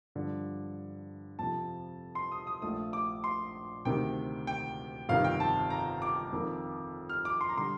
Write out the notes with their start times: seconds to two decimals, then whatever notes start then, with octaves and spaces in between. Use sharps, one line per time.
0.15 G2 D3 F3
1.39 F2 C3 F3 A5
2.15 C6
2.32 D#6
2.47 D#6
2.62 A#1 A#2 F3 A3 D#6
2.93 D6
3.24 C6
3.85 D2 C3 D#3 G5
4.47 G5
5.09 G1 F2 C3 D#3 F5
5.24 G5
5.40 A5
5.70 A#5
6.02 D6
6.32 F2 D#3 A#3
7.09 F6
7.25 D6
7.41 C6
7.49 A#5
7.57 D3 G3 C6